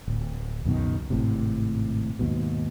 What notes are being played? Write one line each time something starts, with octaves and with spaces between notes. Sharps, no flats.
D1
C#2 F#2 B2 D#3
G#1 A2 C3
D#2 G#2 B2